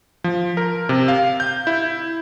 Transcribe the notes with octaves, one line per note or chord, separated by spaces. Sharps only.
F3
A#4
C3
F5
G6
E4